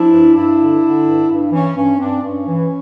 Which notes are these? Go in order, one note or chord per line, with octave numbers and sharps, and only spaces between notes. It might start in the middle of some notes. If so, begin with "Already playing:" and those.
Already playing: F3 D4 E4
G2
G2 D4 E4
D3
D3
G2
G2
E3 C#4
G2 C#4
G2 C4 D4
G2 C#4
E3